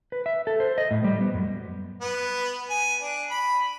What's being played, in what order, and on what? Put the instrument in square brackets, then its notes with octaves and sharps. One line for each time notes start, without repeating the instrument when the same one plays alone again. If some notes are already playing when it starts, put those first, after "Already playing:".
[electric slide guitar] B4
E5
A4
C5
D#5
A2
G3
B3
F#2
[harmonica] B3
G#5
D4
B5